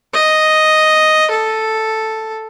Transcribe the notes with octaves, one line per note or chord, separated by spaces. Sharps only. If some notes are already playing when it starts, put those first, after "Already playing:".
D#5
A4